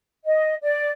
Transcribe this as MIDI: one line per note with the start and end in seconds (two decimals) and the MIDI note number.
0.24 0.54 75
0.61 0.89 74